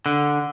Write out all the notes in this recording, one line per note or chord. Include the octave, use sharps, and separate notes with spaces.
D3